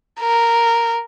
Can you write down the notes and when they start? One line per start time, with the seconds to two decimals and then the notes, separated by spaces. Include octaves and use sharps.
0.20 A#4